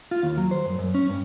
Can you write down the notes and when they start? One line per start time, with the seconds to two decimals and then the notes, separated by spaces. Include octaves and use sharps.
0.11 F4
0.23 D#2
0.37 F#3
0.51 C5
0.65 F#2
0.79 F#2
0.95 C#4
1.09 G2